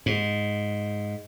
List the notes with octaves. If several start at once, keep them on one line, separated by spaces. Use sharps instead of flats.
G#2